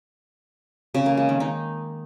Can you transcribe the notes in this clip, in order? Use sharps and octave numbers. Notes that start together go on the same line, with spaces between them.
C#3
A#3
G#3
D#3
D#4